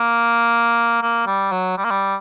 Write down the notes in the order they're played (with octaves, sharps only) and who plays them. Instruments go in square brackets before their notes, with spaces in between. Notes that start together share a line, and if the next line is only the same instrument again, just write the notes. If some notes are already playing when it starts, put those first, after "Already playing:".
Already playing: [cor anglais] A#3
A#3
G3
F#3
G3
A#3
G3